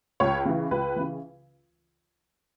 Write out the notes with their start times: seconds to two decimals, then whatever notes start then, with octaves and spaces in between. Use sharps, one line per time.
0.20 C#2 C#5
0.45 C#3 E3
0.71 C#2 B4
0.96 C#3 E3